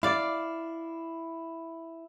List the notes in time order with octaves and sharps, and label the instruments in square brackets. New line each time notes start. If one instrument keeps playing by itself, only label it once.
[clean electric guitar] E4 [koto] D5 F5